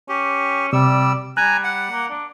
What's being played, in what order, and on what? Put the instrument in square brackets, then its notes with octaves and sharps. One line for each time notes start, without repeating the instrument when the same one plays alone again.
[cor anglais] C#4 [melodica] G4
[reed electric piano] C3 [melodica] G3 E6 [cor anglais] D5
[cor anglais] G3 [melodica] G#5 A#5 [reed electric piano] F#6
[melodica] F#5
[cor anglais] A#3
D4